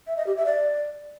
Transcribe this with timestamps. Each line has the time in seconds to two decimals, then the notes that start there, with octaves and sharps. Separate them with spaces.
0.07 E5
0.17 D#5
0.27 G4
0.36 E5
0.46 D5